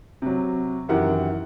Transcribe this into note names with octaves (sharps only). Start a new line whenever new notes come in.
C3 F#3
F#2 D#3 E3 G4 A#4 F#5